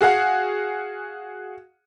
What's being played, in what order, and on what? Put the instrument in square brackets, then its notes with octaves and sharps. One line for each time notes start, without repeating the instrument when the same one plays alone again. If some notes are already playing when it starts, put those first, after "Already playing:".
[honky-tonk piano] F#4 G#4 F5 F#5